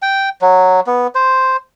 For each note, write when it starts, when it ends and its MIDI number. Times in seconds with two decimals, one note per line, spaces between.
0.02 0.29 79
0.42 0.80 54
0.87 1.07 59
1.15 1.57 72